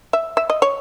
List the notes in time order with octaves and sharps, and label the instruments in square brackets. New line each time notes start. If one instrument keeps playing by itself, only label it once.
[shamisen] E5
E5
D#5
C#5